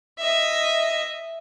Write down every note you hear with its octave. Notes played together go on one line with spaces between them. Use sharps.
D#5 E5